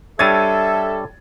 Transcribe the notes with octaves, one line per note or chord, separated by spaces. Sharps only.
G3 D4 A4 C#5 E5 G#6 A6 D#7